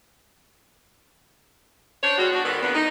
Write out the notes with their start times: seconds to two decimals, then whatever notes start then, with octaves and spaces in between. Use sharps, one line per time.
2.03 D4 C5 C#5
2.17 B2 G3 G#3 F#4
2.32 D4 F#4
2.45 G#2 D3 D#3 B3
2.62 F2 A#2 D3 B3
2.74 D#4